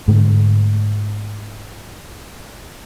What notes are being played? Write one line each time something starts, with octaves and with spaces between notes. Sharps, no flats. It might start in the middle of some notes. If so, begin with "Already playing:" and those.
G#2 D3 A3